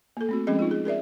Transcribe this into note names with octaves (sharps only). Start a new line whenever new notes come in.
A#3 A4
A3 C4 F#4
F3 G#3 C4 C#4 G#4 D#5
D#4 F4
G#4
G#4 A#4 D5 E5